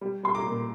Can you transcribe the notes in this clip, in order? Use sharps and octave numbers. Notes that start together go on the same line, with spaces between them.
G3
G3 C6
A#5 D6
A#2